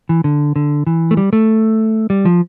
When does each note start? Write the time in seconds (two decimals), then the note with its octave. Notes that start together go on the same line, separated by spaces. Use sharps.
0.09 E3
0.24 D3
0.56 D3
0.87 E3
1.11 A3
1.17 G3
1.33 A3
2.10 G3
2.25 F3